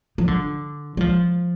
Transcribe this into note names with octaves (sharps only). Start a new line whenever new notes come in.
F3
D3
G3
F3